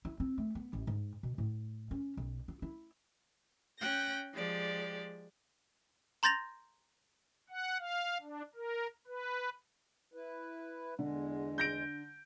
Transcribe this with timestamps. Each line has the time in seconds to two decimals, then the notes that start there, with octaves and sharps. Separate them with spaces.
0.05 E4
0.20 C4
0.38 A3
0.55 B3
0.73 A1
0.87 G#2
1.23 B2
1.38 A2
1.91 C#4
2.17 B1
2.48 F4
2.62 E4
3.78 C#4 G5 F#6 G6 A#6
4.33 F3 G#3 G4 D5
6.23 A#5 C6 G6 A6 A#6 F7
7.50 F#5
7.79 F5
8.21 D4
8.55 A#4
9.07 B4
10.14 E4 B4
10.99 E2 D3 G#3
11.58 G6 A#6 D7